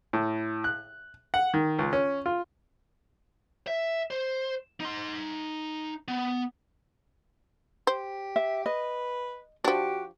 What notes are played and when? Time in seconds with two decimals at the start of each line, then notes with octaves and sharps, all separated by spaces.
0.13 A2
0.64 F#6
1.34 F#5
1.54 D#3
1.79 C#2
1.93 C#4
2.26 F4
3.67 E5
4.10 C5
4.80 D#4 C6
6.08 B3
7.87 G4 C5
8.36 E5
8.66 B4 D#5
9.64 F3 D4 F#4 G4